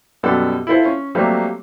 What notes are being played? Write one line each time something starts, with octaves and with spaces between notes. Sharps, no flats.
F#2 B2 G3 A4 F#5
E4 F4 A4 C5
C#4
F#3 G3 A3 A#3 C4